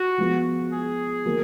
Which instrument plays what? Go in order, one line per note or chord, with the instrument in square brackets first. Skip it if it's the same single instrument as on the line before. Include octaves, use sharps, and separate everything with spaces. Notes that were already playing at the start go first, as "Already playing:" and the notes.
Already playing: [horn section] F#4
[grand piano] F3 G#3 B3 F4
[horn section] G#4
[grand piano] D#3 F#3 A#3 D#4 A#4